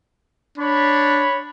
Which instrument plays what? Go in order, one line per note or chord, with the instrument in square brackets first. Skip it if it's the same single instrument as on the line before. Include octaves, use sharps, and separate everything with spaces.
[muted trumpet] D4 [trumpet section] C#5 B5